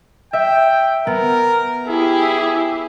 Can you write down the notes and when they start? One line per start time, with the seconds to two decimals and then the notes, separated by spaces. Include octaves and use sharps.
0.33 E5 G5
1.07 B3 A#4
1.88 E4 G4 G#4